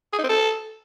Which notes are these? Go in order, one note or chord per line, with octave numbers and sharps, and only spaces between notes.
G#4
D#4
C4
A4